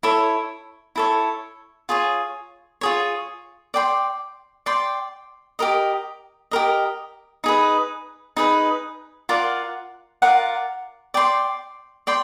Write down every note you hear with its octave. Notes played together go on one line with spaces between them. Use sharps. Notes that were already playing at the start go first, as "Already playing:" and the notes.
E4 A4 C#5
E4 A4 C#5
F4 G#4 C#5
F4 G#4 C#5
D5 G5 C6
D5 G5 C6
G4 A#4 D#5
G4 A#4 D#5
D#4 G#4 B4
D#4 G#4 B4
F4 A#4 D5 F#5
F4 A#4 D5 F#5
D5 G5 C6
D5 G5 C6